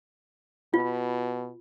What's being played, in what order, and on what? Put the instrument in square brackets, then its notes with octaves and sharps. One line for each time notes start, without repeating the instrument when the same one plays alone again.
[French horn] B2 [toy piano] F4